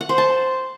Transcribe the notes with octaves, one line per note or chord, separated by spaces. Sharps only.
F#5
C5
A5